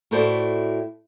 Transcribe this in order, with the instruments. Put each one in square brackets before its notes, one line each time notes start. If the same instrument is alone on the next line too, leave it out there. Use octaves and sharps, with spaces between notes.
[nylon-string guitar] A2 E4 F#4 A4 C5 D5